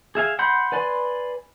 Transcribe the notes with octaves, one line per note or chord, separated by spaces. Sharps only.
G#4 E5 F5 G#5
F#5 B5 C6 G6
B4 D5 G#5 B5 C6